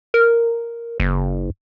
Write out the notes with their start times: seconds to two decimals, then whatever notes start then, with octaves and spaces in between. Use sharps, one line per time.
0.14 A#4
1.00 F#1